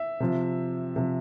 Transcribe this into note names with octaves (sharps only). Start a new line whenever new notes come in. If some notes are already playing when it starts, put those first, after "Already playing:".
Already playing: E5
C3 F3
C3 F3